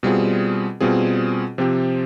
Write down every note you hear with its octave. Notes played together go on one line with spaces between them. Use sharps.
B2 G3 C4 F4 G#4
B2 G3 C4 F4 G#4
C3 F3 C4 G4